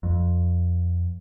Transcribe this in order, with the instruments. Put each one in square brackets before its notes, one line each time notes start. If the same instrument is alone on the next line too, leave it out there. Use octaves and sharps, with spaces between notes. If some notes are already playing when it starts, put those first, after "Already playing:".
[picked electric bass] F2